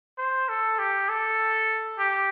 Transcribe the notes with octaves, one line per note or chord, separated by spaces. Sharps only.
C5
A4
G4
A4
G4